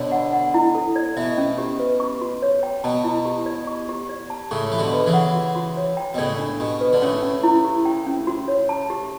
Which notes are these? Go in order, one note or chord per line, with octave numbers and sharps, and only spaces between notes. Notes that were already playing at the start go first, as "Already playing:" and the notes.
Already playing: B2 D3 C#5
F#5
F#5
E4
A4
D5
B2 E5
C#4
G4
B4
C#6
F#4
C#5
G5
B2 A5
E4
G4
D5
C#6
G4
D5
A5
A2 C#3 C#6
E3 G4
B2 D3
B4
C#3 E3
F#5
F#4
F#4
C#5
G5
B2
A2 C#3 D5
D4
B2 G4
B4
D3
A2 C#3 C#4
C#4
E4
G4
G5
C#4
F#4
C#5
A5
G4